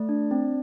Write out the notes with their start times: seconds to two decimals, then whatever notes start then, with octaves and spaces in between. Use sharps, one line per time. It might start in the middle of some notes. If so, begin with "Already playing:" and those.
Already playing: A3 D5
0.09 D4
0.31 C4